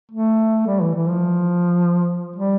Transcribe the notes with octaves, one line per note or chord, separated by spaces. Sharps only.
A3
G3
E3
E3
F3
G3